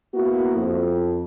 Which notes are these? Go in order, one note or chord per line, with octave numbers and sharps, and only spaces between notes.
A#3 B3 E4 F#4
F2